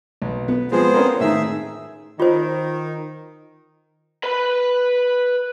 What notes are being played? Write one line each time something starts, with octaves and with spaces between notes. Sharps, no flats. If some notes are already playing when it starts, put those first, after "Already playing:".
B1
B3
F3 G#3 B3 C4 G#4 C5
A#3 C4 C#4
A2 D#3 D#4 G#4 E5 E6
D#3 F4 C5
B4 B5